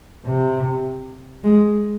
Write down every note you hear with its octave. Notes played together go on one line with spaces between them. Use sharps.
C3
G#3